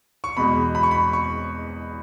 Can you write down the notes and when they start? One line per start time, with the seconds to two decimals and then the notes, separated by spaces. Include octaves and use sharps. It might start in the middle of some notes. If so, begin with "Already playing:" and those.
0.24 C#6
0.37 E2 B2 G#3 B5
0.75 B5
0.83 C#6
0.91 B5
1.13 C#6